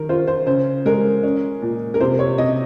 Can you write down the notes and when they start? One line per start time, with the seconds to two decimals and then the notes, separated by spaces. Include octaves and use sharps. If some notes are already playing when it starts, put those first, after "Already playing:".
Already playing: D#3 A#4
0.09 F4 C5
0.27 C5
0.46 C#3 C5
0.86 G#3 A#4
1.23 C#4
1.62 A#2
1.94 A#4
2.00 C3 C5
2.19 C#5
2.38 C3 D#5